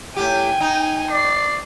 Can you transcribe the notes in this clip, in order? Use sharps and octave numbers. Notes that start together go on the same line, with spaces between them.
A2 G4 G5 G#5
D#4
D5 C7